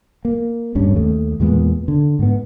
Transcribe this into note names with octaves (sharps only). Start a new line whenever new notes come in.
A#3
D1 D2 G2 C#4
D#2 A3
E2 A#2 G#3 B3
D3
G#2 B3